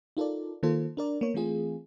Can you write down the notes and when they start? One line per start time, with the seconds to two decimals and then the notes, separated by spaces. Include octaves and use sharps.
0.17 D#4 F4 A4 A#4 D5
0.63 D#3 A#3 F4 A4 C5
0.97 D4 A#4 D5
1.21 A#3 B3 A#4 C#5
1.34 E3 A3 C4 F4 G#4